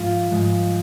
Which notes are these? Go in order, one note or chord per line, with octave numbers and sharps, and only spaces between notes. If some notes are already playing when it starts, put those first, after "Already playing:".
Already playing: G#2 F3 G#3 F4
G#2 F3 G#3